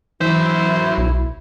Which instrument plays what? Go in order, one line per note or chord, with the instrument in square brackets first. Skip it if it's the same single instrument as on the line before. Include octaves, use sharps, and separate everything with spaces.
[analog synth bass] E3 [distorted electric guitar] F#3 E5 [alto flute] E4 [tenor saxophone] C5
[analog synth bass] B1